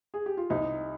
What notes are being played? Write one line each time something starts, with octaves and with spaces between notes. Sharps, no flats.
G#4
G4
F4
C2 D#4